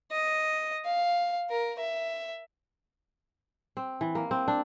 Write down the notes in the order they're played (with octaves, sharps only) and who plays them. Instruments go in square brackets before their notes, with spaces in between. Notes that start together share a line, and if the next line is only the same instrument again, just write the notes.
[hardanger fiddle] D#5
F5
A#4
E5
[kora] C4
E3
A#3
C4
D4